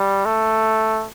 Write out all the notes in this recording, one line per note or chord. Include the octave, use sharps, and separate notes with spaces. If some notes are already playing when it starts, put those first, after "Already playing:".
Already playing: G3
A3